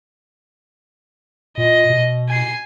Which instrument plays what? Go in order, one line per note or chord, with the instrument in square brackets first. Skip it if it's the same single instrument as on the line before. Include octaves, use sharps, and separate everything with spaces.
[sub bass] A#2 [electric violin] D#5
[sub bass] B2
[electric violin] G#5 C7